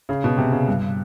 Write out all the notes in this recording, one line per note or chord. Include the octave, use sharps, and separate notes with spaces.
C#3
B2
C3
C#3
G2